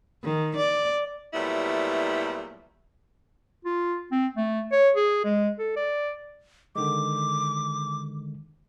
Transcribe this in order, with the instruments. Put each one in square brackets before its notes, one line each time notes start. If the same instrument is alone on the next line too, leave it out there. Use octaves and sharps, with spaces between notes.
[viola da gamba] D#3
D5
[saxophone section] A#2 F#3 G3 A3 B3 E4
[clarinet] F4
C4
A3
C#5
G#4
G#3
A4
D5
[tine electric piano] D3 D#3 G#3 [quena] D6